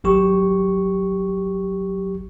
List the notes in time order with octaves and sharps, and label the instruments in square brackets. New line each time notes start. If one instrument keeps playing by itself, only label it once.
[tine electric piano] G#1 F#3 G4 C#6